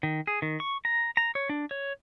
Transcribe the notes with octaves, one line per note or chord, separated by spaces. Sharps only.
D#3
G#4
D#3
C#6
A#5
A#5
C#5
D4
C#5